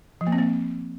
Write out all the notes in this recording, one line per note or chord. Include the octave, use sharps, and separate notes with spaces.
F3
A#3
C4
A#3